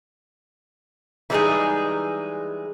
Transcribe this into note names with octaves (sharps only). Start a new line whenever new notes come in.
E3 G3 G#3 D4 D#4 G#4